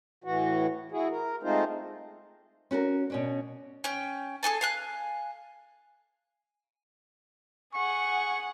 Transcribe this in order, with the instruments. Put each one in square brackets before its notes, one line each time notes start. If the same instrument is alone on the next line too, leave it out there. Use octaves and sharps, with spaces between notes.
[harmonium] A2 E3 F#4
E4 F#4 G#4
A#4
G#3 A3 C4 D#4 F4 C5
[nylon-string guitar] C#4 F#4 A4 A#4
B2 C#4 D4
[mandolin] C#4 G5
G#4 A4 G#5 A5
F5 G#5 F#6
[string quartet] G#4 F#5 [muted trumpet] C#6